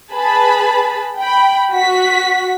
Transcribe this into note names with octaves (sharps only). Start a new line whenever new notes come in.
G#4 B4 A5 B5
G5 B5
F#4 B6